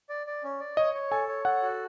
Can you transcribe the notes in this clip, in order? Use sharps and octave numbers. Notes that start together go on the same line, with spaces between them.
D5
D5
C#4
D5
C#5 D#5
C#5
A4 G#5
C#5
A4 F#5
F#4